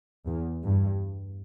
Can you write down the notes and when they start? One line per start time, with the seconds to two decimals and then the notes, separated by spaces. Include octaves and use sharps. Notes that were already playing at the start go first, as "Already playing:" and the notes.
0.27 E2
0.64 G2